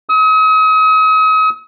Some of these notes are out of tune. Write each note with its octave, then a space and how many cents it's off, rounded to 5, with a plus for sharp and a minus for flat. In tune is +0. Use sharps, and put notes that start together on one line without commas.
D#6 +40